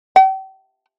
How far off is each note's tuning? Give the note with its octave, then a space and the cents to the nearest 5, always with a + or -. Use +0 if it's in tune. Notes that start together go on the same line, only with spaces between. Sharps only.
G5 -40